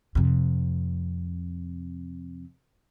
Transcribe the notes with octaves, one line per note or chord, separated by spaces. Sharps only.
F2 C3